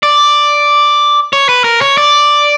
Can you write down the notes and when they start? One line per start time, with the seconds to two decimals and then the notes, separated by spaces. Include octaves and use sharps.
0.03 D5
1.33 C#5
1.49 B4
1.64 A#4
1.81 C#5
1.98 D5